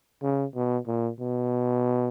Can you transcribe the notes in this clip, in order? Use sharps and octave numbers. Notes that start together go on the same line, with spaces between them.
C#3
B2
A#2
B2